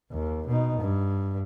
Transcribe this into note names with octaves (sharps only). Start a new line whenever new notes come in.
D#2
B2 D#4
G2